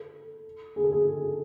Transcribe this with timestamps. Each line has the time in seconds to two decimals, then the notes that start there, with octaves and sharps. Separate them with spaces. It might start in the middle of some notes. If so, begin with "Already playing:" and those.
Already playing: A4
0.76 G#4
0.84 A4
0.92 G#4